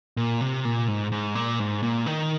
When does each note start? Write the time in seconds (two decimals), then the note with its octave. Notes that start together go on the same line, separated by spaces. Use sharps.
0.17 A#2
0.41 C3
0.65 A#2
0.88 G#2
1.12 G#2
1.35 A#2
1.59 G#2
1.83 A#2
2.06 D#3